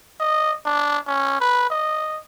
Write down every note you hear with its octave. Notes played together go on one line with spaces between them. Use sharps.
D#5
D4
C#4
B4
D#5